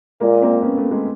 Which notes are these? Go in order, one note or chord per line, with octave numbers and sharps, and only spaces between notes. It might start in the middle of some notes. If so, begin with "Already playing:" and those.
A#2 G#3 A#3
A#3 C4
B3 C#4
A3 B3
G#3 A#3